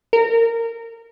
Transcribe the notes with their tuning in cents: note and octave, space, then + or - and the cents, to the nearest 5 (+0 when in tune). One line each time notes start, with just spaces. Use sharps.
A#4 -20